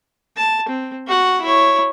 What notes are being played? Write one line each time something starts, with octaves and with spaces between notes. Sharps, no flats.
A5
C4
F#4 F#5
E4 C#5